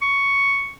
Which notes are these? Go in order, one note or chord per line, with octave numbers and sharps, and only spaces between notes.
C#6